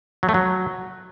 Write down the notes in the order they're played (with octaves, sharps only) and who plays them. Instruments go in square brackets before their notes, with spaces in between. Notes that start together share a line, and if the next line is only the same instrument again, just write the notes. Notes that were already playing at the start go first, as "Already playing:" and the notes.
[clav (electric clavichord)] F#3
A3
F#3